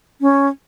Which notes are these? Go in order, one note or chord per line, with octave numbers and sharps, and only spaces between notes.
C#4